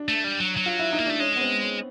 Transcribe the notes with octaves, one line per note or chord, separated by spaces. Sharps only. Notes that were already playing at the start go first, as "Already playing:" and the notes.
Already playing: D4
A3
G3
F#3
F#3
F4
E4
D#4
A#3
A3 D4
G#3 C#4
B3
C4
C#4